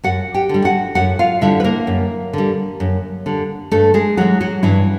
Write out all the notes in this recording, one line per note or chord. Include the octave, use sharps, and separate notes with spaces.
F#2 F#4 F#5
G4 G5
D3 G3
F#4 F#5
F#2 F#4 F#5
F4 F5
D3 G3 E4 E5
B4
A#3 A#4
F#2
D3 G3
F#2
D3 G3
G2 A3 A4
G#3 G#4
E3 F#3 G#3 F#4
F#3 F#4
G2 E3 E4